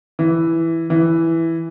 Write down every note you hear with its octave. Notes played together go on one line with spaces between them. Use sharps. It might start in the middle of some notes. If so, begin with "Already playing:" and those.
E3
E3